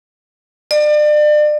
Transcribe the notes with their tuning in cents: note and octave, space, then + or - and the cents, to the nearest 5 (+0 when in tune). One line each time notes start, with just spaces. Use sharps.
D5 +35